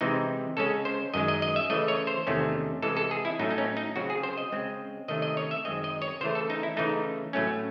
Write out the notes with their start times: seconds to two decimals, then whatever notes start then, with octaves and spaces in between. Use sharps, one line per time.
0.01 C3 E3 G#3 C4 D#4
0.57 C#3 G#3 C#4 A4
0.85 C5
1.14 F#2 D#3 G#3 D#5
1.28 D#5
1.42 D#5
1.56 E5
1.70 C#3 E3 A3 D#5
1.88 C#5
2.07 C5
2.27 E2 C3 D#3 A3 C#4
2.82 C3 E3 G#3 A4
2.97 A4
3.11 G#4
3.25 E4
3.39 A2 F#3 A3 C#4 D#4
3.51 D#4
3.58 C#4
3.77 D#4
3.96 C#3 F#3 C4 F#4
4.10 G#4
4.23 C5
4.37 D#5
4.52 C#3 G#3 C4
5.08 C3 D#3 A3 C#4 D#5
5.22 D#5
5.37 C#5
5.51 E5
5.65 F#2 D#3 G#3 C4 D#5
5.84 D#5
6.02 C#5
6.21 C#3 E3 A3 C5
6.35 A4
6.50 D#4
6.63 E4
6.77 C#3 E3 A3 D#4
7.33 A2 F#3 A3 C#4